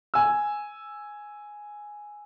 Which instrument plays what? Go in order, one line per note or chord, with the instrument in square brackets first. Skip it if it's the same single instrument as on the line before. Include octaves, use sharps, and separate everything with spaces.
[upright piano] G#5 E6